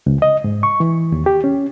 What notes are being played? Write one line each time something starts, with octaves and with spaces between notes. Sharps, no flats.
C#2
D#5
G#2
C#6
E3
D#2
G4
C#4